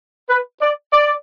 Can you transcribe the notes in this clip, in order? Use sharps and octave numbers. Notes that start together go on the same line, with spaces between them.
B4
D5
D5